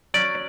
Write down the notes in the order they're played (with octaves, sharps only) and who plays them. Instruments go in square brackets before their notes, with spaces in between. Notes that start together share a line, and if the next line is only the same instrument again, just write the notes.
[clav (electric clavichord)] F#3 C#4 D5